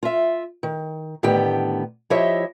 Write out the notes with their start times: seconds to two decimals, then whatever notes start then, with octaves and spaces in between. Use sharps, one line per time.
0.03 F4 E5
0.63 D#3
1.23 A2 D3 D#3 B3 G4 G5
2.10 F3 E4 G4 C#5 D#5 E5